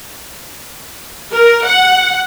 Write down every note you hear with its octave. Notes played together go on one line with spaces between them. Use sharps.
A#4
F#5